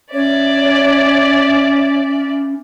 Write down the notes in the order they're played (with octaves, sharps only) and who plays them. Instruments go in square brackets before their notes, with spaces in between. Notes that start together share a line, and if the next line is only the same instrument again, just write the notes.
[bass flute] C#4 [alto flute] C#5 [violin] D5 E5